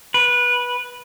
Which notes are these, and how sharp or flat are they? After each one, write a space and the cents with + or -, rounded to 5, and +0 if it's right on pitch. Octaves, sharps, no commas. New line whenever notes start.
B4 -15